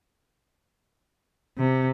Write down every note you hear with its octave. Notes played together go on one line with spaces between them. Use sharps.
C3